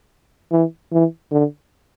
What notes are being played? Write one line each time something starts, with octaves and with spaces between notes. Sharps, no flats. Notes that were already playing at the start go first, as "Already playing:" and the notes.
E3
E3
D3